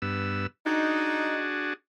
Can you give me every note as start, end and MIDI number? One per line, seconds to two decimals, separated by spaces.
0.02 0.47 43
0.02 0.47 59
0.02 0.47 88
0.66 1.73 62
0.66 1.45 63
0.66 1.73 66
0.66 1.73 68